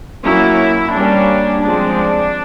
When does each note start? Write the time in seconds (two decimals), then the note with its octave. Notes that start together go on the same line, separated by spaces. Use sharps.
0.24 F#3 A#3 C#4 E4
0.94 G3 A#3 C#4 D4
1.63 F3 G#3 C4 D4